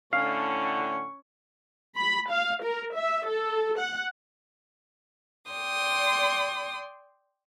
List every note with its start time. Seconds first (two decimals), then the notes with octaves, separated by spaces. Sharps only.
0.13 A2 D3 C#4 F5 C#6
1.97 B5
2.30 F5
2.63 A#4
2.95 E5
3.27 A4
3.79 F#5
5.52 D5 G5 C6 D#6